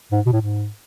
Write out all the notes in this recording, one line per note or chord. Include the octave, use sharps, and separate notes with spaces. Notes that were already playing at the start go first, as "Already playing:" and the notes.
G#2
B2
A2
G#2